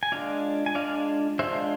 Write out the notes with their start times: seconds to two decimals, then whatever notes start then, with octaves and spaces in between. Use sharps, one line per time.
0.03 G#5
0.12 G#3 D4 F4 D5 F5
0.66 G#5
0.75 G#3 D4 F4 D5 F5
1.39 G#3 D4 F4 C5 E5